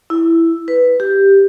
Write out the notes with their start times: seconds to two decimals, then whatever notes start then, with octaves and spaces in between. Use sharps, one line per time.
0.10 E4
0.68 B4
1.00 G4